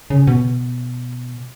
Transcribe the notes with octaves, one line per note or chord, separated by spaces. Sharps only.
C#3
B2